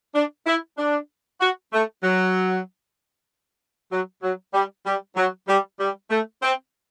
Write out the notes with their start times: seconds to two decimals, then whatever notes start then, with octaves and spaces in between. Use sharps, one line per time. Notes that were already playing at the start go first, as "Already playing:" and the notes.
0.15 D4
0.47 E4
0.78 D4
1.41 F#4
1.73 A3
2.03 F#3
3.91 F#3
4.23 F#3
4.54 G3
4.86 G3
5.16 F#3
5.48 G3
5.80 G3
6.10 A3
6.42 C4